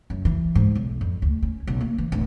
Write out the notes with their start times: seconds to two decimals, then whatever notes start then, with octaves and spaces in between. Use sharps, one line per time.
0.10 F#2
0.25 E3
0.55 G#2
0.75 B1
1.01 F2
1.22 D2
1.43 C#4
1.67 B1
1.81 A#3
1.98 E3
2.12 D1